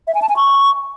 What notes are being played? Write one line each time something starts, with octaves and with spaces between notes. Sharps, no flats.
E5
G#5
A5
G#5
C#6